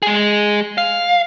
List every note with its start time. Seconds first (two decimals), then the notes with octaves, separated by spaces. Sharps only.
0.03 G#3 G#4
0.78 F5